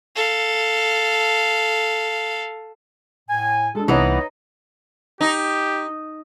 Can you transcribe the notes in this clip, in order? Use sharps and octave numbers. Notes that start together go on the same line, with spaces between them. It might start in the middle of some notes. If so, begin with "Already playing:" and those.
A4 F5
A2 G#5
G#3 D4 A4
C2 E3 B3 D#4 B4 C#5 D#5
D#4 G4